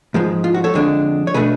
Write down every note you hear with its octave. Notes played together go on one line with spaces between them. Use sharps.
G#2 F3 G#3
F4
F#4
A4 C#5
F2 D3 G#3 B3 D4
C#5
B2 A3 D4 G#4 B4